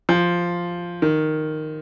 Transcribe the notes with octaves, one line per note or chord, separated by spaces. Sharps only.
F3
D#3